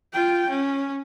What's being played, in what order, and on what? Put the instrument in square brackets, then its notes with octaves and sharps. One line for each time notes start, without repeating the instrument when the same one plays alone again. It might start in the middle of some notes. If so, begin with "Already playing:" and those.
[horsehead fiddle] F4 G5
C#4